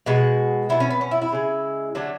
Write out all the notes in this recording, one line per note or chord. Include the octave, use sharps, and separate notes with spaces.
B2 G#3 F#4
B2 F#3 A3 E4
C#4
B3
C#4
E4
E4
C#3 G#3
D3 F#3 A3 D4